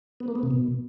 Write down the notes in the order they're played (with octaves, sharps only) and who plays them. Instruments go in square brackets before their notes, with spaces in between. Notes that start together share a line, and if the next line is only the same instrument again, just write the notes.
[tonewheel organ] B3
A#3
B3
C3
B2